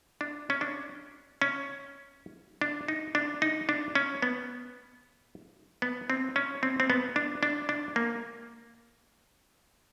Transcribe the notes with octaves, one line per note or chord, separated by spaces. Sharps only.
D4
C#4
D4
C#4
D4
D#4
D4
D#4
D4
C#4
B3
B3
C4
C#4
C4
C4
B3
D4
D4
D4
A#3